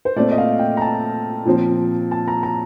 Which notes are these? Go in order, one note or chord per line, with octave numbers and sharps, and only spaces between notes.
C5
A#2 A3 C4 D5
D#5
F5
G5
A#5
A5
A#2 F3 C4
A5
A#5
A#5